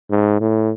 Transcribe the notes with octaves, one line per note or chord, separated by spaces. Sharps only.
G#2
A2